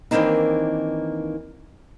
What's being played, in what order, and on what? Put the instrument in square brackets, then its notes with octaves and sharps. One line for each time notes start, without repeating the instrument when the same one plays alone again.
[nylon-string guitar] D#3 E3 A#3 C4 D4 D#4